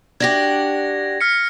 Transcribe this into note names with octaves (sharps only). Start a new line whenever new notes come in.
D4 F#4 G4 G#6 A#6
F6 B6 C#7